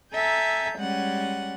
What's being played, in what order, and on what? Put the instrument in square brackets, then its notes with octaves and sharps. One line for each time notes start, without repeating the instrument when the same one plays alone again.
[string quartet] A4 E5 G#5 A#5 G6
G3 G#3 C#4 F#5